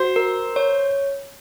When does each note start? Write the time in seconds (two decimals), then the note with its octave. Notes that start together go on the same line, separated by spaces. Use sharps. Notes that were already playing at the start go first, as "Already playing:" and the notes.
Already playing: F#4 C5
0.16 A#4
0.56 C#5